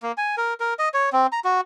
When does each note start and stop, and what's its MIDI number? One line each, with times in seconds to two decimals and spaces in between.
0.03 0.12 58
0.17 0.35 80
0.37 0.54 70
0.60 0.74 70
0.79 0.89 75
0.94 1.09 73
1.13 1.27 60
1.32 1.40 82
1.44 1.61 66